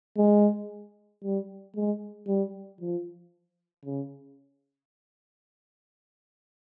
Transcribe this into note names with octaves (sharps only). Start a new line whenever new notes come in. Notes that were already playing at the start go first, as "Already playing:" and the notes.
G#3
G3
G#3
G3
F3
C#3